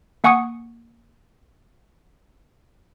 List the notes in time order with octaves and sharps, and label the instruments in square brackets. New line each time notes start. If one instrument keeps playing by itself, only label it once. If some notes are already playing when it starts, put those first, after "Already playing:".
[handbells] A#3 F#5 G#5 C#6 D#6 C#7